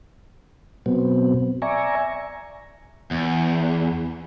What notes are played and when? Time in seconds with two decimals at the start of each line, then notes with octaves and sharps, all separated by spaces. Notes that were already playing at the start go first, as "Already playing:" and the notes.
0.86 B2 F#3 B3 C4
1.62 D5 E5 G#5 A#5 C#6
3.11 E2